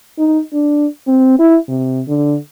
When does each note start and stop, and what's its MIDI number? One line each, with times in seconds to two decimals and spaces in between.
0.19 0.40 63
0.53 0.86 62
1.07 1.34 60
1.39 1.57 64
1.68 2.01 48
2.08 2.36 50